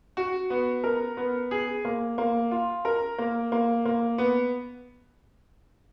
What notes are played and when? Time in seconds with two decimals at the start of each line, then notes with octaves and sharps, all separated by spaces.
0.17 F#4
0.50 B3
0.84 A#4
1.17 B3
1.51 G#4
1.85 A#3
2.18 A#3
2.51 F4
2.85 A#4
3.18 A#3
3.52 A#3
3.85 A#3
4.18 B3